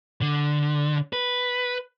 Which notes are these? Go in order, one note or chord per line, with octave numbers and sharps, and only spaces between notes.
D3
B4